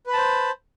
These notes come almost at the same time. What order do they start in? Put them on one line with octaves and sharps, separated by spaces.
B4 B5 A5 C5